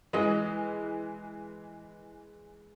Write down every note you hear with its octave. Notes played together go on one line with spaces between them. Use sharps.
E3 G#3 E4 G#4 D#5